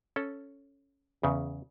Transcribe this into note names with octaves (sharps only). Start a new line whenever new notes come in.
C#4 A4
E2 C#3